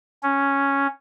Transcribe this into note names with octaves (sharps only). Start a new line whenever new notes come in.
C#4